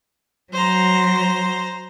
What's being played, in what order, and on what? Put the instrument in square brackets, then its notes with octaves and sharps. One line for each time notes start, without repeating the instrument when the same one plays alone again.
[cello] F#3 [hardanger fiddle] C5 A#5